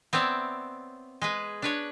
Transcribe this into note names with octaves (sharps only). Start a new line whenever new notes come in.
B3 C4 C#5 D5 E5
G#3 G#4 B4
D4 B4 C#5